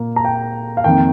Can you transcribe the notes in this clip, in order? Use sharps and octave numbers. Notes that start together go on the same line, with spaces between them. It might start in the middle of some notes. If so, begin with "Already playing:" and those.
Already playing: A#2 A#3
A#5
G5
F5
F2 D#3 A#3 G5